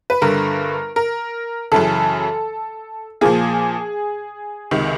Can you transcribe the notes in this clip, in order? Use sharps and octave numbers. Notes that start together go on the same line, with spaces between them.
B4
G1 G2 D3 A#4
A#4
F#2 C#3 E3 A4
A#2 F3 A#3 G#4
C#2 C3 D#3